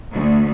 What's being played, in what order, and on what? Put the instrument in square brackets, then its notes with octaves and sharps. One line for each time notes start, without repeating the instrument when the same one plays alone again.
[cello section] D2